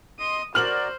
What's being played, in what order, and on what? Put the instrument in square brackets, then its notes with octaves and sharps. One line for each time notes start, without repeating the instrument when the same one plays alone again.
[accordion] D#5 C6 [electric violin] D#6
[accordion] F#4 A#4 D5 [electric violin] C5 [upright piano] F6 F#7